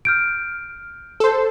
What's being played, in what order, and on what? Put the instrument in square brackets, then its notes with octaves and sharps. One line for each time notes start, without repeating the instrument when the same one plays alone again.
[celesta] F6 G6 D7
[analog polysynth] A4 C5